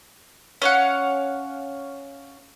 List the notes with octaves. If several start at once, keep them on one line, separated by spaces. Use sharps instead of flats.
C#4 F5 F#5